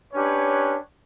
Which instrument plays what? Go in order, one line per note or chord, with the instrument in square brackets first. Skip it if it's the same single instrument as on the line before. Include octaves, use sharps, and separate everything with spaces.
[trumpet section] C#4 D4 G4 B4 C#5